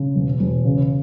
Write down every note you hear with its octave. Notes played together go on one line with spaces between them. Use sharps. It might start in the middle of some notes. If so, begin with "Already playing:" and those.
Already playing: C#3
E1
E1
C#3